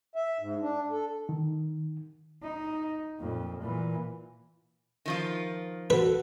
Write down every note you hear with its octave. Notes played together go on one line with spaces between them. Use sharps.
E5
G#2
D4
A4
D#3
D#4
F2 A#2
A#2 E3
D#3 F3 F4
F#4 A4 B4